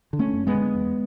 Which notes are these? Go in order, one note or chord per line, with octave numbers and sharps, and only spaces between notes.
D3
A3 C#4
F#2
G#3 B3
D3
E2